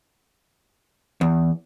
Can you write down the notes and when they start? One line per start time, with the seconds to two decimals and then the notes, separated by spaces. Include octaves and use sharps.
1.21 E2